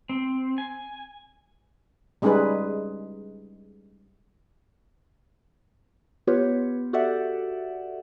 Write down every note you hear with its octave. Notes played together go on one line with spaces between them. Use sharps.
C4
G#5
G3 G#3 C#4 D#4 G#4 B4
B3 F4 G4 B4 C#5
F#4 G4 A4 D5 E5 F#5